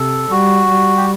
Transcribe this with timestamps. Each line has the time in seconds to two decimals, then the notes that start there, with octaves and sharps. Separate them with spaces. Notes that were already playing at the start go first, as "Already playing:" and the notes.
Already playing: C3 A4
0.30 G3 F#4
0.69 G3
0.97 G4